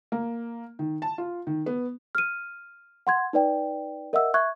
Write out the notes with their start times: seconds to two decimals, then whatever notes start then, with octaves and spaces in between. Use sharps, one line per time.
0.12 A#3
0.79 D#3
1.02 A5
1.18 F4
1.47 D#3
1.66 B3
2.15 F6 D#7
3.07 F#5 C6 G#6
3.33 D#4 B4 D5 G5
4.13 A#4 D#5 E5 F#5 E6
4.34 E5 C#6 F#6 G#6